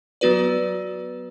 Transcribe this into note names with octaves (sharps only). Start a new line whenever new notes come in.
F#3 B3 F#4 B4 D5